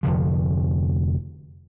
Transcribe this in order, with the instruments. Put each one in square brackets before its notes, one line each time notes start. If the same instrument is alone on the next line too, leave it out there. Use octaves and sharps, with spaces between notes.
[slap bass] F1 F2 D3 F3